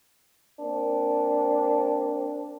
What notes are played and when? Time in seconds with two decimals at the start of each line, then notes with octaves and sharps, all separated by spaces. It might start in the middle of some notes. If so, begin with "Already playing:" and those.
0.60 A#3 C4 D4